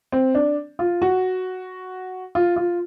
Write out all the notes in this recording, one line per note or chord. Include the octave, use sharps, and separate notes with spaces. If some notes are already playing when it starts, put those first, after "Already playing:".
C4
D4
F4
F#4
F4
F4